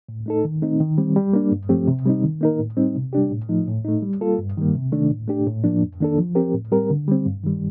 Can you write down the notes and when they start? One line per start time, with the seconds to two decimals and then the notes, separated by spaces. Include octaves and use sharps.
0.09 A2
0.26 A3 D#4 A4
0.44 D#3
0.62 A3 C4 D#4
0.80 D#3
0.98 G3 C4
1.16 G3
1.33 A#3 D4
1.52 G2
1.69 F3 A3 C4 G4
1.88 C3
2.05 G3 C4 D#4
2.24 D#3
2.41 A#3 D#4 A#4
2.59 A2
2.77 G3 C4 D#4
2.95 C3
3.13 G3 D4 G4
3.31 A2
3.49 F3 A3 D#4
3.67 A2
3.85 A3 D#4
4.02 G3
4.21 A#3 F4 A4
4.39 G2
4.57 D#3 G3 A#3
4.75 C3
4.92 D#3 A3 D4
5.10 A2
5.28 A3 D4 G4
5.46 A2
5.64 F3 A#3 D4
5.82 F2
6.00 D#3 A#3 D4 A4
6.18 F3
6.35 C4 G4 A#4
6.54 A2
6.72 G3 C4 G4 A#4
6.90 D3
7.08 G3 C4
7.26 G2
7.44 D#3 G3